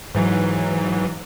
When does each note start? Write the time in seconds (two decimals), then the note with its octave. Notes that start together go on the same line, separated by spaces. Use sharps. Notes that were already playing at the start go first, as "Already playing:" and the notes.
0.15 G#2 E3 F#3